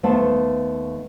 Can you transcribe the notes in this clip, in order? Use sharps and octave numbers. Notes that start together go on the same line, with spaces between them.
D#2 A3 B3 C5 F5 A5